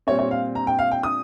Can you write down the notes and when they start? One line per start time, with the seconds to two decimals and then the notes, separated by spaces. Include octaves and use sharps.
0.07 A#2 G3 C4 C#5
0.19 C#5
0.31 F5
0.55 A#5
0.67 G5
0.79 F5
0.91 G5
1.03 D#6